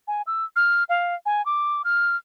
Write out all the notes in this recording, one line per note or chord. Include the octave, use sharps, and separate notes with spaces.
G#5
E6
F6
F5
G#5
D6
F6